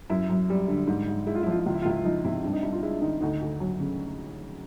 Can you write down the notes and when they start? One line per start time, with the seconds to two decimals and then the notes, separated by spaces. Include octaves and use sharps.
0.10 F#2 E4
0.30 F#2
0.50 G3
0.68 D3
0.87 G#2
1.08 G#2
1.26 G#3 E4
1.35 F4
1.43 E4
1.47 F3 F4
1.59 E4
1.66 C#2 F4
1.74 E4
1.82 F4
1.85 C#2 E4
2.04 F3 D#4
2.24 C3 E4
2.44 G2 D4
2.53 D#4
2.63 G2 E4
2.73 F4
2.83 G#3 E4
3.01 D#3 D#4
3.21 D2 D#4
3.41 D2
3.60 F#3
3.80 C#3